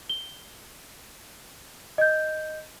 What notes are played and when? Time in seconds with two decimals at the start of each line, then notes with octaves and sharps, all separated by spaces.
0.09 G7
1.98 D#5 G6